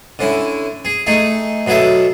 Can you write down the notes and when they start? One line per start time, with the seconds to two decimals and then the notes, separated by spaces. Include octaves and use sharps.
0.19 D3 C#4 E4
0.85 G#4
1.07 A3 D#4 G#4
1.67 B2 F#3 G#4 A4 E5